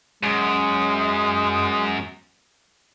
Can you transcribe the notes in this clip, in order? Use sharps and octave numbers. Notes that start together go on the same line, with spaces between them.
F#2 G#3